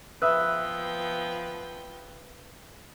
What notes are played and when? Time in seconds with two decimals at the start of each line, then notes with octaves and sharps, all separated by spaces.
0.22 F3 B3 B4 E5 G5 D#6 E6 F#6